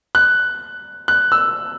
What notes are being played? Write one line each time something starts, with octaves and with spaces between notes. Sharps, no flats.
F#6
F#6
E6